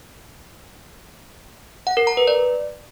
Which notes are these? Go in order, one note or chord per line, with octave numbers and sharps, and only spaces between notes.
F#5
A#4
A#5
B4
D5